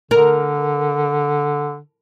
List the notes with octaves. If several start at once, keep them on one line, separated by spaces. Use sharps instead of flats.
D3 A#4